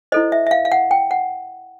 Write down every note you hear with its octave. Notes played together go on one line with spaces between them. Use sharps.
E4 A4 C5 D#5
E5
E5
F5
F5
F#5
G5
F#5